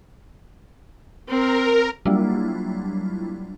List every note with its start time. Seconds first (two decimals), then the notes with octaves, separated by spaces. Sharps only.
1.28 C4 A#4
2.05 F#3 G3 A#3 D4 E4 F4